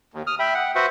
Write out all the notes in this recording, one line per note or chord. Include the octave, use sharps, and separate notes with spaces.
D#2
D#6 F6
E5 G5 B5
F#5
F#4 B4 C5 E5 F#5